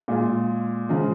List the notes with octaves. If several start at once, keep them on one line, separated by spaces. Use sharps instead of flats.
A#2 G#3 F4
C#3 F3 G#3